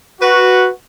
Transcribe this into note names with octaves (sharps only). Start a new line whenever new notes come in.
F#4 B4